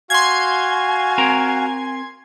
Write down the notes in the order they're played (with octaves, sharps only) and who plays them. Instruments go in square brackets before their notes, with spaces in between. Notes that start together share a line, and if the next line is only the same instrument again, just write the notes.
[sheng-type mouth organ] F#4 F5 [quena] G#5 [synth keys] C6 G#6
[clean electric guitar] C4 A#4 A#5